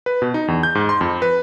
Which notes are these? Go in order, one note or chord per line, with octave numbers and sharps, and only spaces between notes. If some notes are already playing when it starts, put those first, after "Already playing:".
B4
B2
D#4
E2
G6
G#2
C6
F2
B4